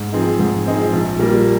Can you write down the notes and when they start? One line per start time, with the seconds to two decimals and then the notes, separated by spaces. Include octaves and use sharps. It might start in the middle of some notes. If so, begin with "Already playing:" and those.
Already playing: G#2
0.12 F3 C4 D#4 G#4
0.39 G#2
0.66 F3 C4 D#4 G#4
0.93 A#1
1.19 A#2 G3 A#3